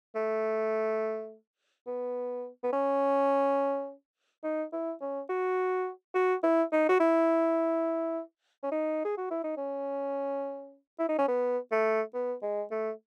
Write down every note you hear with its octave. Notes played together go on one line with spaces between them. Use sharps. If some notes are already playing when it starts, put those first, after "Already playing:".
A3
B3
B3
C#4
D#4
E4
C#4
F#4
F#4
E4
D#4
F#4
E4
C#4
D#4
G#4
F#4
E4
D#4
C#4
E4
D#4
C#4
B3
A3
B3
G#3
A3